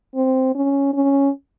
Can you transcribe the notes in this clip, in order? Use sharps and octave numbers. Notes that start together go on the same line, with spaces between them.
C4
C#4
C#4